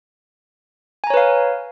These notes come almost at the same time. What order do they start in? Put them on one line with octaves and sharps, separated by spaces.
G#5 A#5 C#5 B4 F5